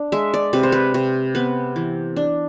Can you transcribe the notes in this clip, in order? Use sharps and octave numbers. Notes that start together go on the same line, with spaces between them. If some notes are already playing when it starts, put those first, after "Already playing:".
Already playing: D4
G#3 E5
D5
C3 B4
C5
B4
C3
B3 B4
E3
D4